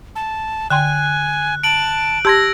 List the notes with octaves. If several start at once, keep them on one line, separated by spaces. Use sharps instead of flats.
A5
D3 G5 G#5 C6 F#6
A5 D7 F#7
G4 A5 C6 E6 G#6 A#6